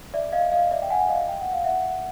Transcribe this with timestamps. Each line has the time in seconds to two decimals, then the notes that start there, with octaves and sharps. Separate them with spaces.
0.14 D5 E5
0.32 D#5 F5
0.51 D#5 F5
0.71 D5 E5
0.82 G5
0.90 F#5 G#5
1.09 D#5 F5
1.28 G5
1.41 F#5
1.53 F5
1.64 E5 F#5